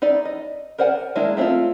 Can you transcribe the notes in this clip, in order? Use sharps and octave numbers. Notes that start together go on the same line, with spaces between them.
D#4 E4 D5
D#5
A#4 C5 D5 F#5 G#5
D#3 G#3 A#3 D4 E4
A3 C4 D4 E4 F4